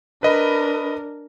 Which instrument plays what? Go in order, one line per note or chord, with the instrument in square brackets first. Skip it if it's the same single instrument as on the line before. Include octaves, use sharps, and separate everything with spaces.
[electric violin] D4 A#4 [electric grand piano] B4 D#5 B5